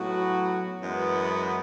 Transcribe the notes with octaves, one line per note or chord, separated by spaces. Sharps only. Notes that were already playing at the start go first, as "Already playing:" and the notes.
Already playing: A2 F#3 B3 F#4
F#2 E3 G#3 B3